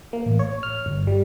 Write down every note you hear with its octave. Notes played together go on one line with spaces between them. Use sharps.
A#3
A1
C#5
F6
G1
G3